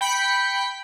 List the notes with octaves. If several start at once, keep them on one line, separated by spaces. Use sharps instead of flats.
G5 B5 B6 C#7